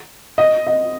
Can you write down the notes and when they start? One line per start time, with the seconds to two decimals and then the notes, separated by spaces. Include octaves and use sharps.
0.38 D#5
0.67 D#5